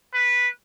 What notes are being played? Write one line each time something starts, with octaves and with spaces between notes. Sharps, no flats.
B4